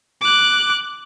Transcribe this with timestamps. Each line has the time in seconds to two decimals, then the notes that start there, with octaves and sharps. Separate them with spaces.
0.21 D6 F#6